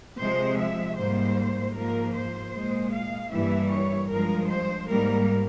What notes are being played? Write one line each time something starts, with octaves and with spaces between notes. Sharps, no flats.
C3 F3 G#3 C5
E5
G#2 G3 A#3 C5
G#2 F3 A#3 A#4
C5
A#2 G#3
F5
G2 E3 G3 A#3 E5
C#5
G2 F3 G#3 A#4
C5
G#2 G3 A#3 A#4